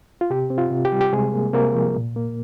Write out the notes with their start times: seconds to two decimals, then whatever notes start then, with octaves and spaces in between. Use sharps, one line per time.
0.21 F4
0.30 C3 G4
0.50 C4
0.58 F4
0.71 C3
0.85 G4
0.92 G3
1.01 G4
1.13 C3 G#3 G#4
1.34 A#3
1.54 C3 A#3 A#4
1.74 F3
1.96 A#2
2.16 A#3